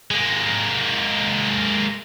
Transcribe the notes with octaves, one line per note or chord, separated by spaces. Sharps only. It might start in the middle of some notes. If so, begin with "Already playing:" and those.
G#3 A#3